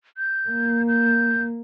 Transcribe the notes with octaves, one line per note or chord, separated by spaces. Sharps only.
G6
A#3
G6